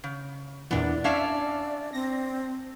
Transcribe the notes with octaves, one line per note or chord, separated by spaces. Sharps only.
C#3
E2 A#2 E3 B3 D4 D5
C#4 D4 E5 F5
C4 A#6